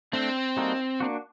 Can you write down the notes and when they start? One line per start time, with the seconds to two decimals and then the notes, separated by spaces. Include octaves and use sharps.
0.13 A3 C4 D4 A4
0.57 G3 A#3 D#4 F#4 A4
1.00 A#3 D4 F#4